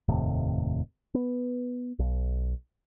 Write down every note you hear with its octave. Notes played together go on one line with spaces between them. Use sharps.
F1 D#2 A2 C3
B3
B1